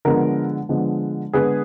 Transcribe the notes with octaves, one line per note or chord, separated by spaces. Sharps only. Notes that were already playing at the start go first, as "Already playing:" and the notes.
D3 F3 G#3 B3 A#4
D3 F3 G#3 B3
D3 G#3 B3 G#4 B4